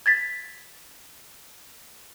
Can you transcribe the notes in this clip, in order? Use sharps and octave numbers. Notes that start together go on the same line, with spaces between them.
G#6 A6 B6